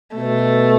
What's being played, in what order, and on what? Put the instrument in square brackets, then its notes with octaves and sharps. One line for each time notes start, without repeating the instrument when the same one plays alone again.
[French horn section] B2 [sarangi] A3